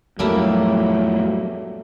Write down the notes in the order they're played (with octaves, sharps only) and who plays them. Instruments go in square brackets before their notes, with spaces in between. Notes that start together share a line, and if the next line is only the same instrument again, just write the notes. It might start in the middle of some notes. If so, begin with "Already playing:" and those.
[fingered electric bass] F2 A2 [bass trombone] F#3 [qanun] G3 A3 A#3